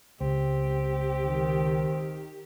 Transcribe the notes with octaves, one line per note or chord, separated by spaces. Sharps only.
C#2 C4 G4
D#3